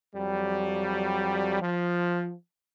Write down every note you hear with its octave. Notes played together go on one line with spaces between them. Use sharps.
F2 F#3 G3
F3